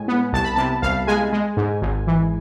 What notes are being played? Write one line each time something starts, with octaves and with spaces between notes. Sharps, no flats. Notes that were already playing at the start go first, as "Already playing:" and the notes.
Already playing: A2 G#3 G#5
B3
C2 A5
B5
C3 A5
C2 F5
G#3 G#5
G#3
G#2
G#1
E3